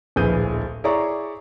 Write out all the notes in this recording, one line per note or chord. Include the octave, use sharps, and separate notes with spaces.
D1 A#1 G#4 B4 G6 D#7
E4 G#4 C#5 D5 A#5 C#6